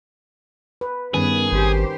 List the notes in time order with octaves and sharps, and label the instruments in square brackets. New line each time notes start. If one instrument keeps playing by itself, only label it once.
[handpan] B4
[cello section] G2 B3 [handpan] D#3 C#4 B4 [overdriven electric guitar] G#4
[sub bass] G#1 [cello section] G4 C5